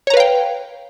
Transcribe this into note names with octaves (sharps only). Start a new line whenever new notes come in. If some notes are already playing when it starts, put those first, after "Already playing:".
B4 C#5 F5 G5 A#5